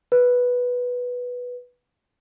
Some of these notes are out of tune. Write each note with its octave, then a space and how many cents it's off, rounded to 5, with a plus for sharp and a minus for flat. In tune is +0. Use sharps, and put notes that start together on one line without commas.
B4 -5